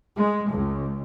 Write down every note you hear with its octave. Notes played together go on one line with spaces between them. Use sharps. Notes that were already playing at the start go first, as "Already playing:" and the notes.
G#3
C#2